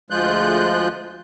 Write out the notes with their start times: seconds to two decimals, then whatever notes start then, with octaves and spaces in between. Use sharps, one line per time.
0.10 D2 F3 G#3 F4 F#6 G6